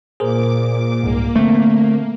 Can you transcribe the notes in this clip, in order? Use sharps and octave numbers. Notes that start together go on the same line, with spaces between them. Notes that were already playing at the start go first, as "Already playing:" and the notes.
A#2 G#4 A#4 C5 D6
C2 G#2 A#3
D3 A3 C4